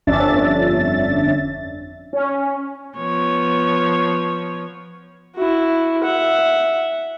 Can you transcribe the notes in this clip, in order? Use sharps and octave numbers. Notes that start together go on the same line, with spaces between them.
G1 F2 C#4 D4 E5 A6
C#4
F3 B3 C#5
E4 F#4
E5 F#5